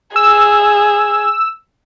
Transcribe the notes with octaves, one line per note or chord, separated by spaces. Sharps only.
G#4 E6